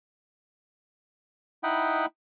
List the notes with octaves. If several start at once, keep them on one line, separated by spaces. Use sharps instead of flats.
D#4 E4 D#5 F#5 G5 B5